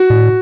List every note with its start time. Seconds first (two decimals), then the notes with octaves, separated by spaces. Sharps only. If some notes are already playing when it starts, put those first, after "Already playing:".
Already playing: F#4
0.10 A2